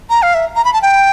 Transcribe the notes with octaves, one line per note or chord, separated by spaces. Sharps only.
A#5
F5
E5
A#5
B5
A5
G5